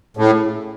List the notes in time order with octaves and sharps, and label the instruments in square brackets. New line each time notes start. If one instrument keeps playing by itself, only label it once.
[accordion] A2 [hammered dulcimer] C#3